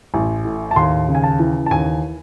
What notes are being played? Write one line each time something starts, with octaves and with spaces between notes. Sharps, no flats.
A1
A2
A5
D#2 C6
C#3
G#5
A5
E3
A5
D#2 G#5